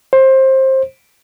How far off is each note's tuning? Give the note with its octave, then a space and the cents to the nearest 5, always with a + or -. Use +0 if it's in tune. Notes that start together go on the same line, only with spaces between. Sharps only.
C5 +20